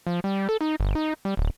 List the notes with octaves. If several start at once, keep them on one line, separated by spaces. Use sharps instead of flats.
F3
G3
A4
D#4
G1
D#4
G3
D1